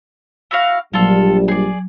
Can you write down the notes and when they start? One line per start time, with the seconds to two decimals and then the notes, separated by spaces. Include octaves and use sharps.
0.51 E4 F#4 F5
0.93 A#1 F#3 G3 F4 A4
1.48 G#4 D5